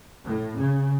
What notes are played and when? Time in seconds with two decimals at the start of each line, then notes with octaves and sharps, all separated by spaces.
0.24 A2
0.57 C#3